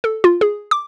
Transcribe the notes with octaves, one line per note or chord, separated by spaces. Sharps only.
A4
F4
G#4
D6